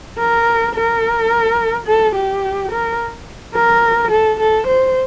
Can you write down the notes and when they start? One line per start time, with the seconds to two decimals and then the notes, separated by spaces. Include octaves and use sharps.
0.18 A#4
0.75 A#4
1.87 A4
2.15 G4
2.72 A#4
3.55 A#4
4.11 A4
4.40 A4
4.67 C5